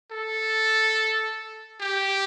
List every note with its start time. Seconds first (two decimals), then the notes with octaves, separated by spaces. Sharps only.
0.11 A4
1.80 G4